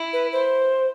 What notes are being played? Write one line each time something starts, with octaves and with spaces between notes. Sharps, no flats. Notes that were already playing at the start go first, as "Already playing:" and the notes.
Already playing: E4
B4
C5